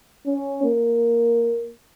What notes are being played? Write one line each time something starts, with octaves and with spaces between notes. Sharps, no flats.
C#4
A#3